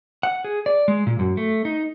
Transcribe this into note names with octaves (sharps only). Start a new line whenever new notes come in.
F#5
G#4
D5
G#3
A#2
F#2
A3
D#4